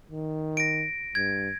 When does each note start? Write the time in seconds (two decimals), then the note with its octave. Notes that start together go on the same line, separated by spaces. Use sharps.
0.11 D#3
0.57 A#6 D7
1.15 G2 G#6